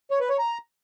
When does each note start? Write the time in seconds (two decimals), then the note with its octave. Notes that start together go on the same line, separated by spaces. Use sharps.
0.11 C#5
0.20 B4
0.29 C#5
0.39 A#5